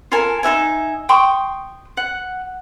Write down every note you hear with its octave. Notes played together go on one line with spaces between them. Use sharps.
F4 A4 A#4 G#5
D#4 F#4 E5 G#5
G5 C6 C#6 D#6
F#5